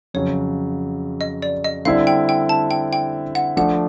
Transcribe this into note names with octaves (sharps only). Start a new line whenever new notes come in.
F2 C#3 F#3 C#5
D#5
D5
D#5
D3 G3 C4 E4 F5
G5
G5
A5
G5
G5
F#5
F3 A3 D4 F#5